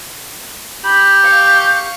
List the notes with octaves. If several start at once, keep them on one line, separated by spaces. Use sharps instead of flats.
G4 B5
F5 C#6